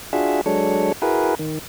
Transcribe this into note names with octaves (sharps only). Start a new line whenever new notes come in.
D4 F4 F#4 G#4 E5
F#3 G#3 D4 A4 C#5
E4 F#4 G#4 A#4 B4
D#3